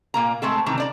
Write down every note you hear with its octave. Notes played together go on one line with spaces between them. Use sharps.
A#2 A#3 A#5
G#3 A3 C4 A4
C3 D#3 E3 A#5
D4 D5 A#5